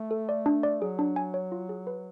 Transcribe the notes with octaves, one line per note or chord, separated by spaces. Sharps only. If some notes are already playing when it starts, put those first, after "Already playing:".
Already playing: A3
A4
D5
D4
D5
F#3 G#4
D4
G#5
C#5
F4
G#4
B4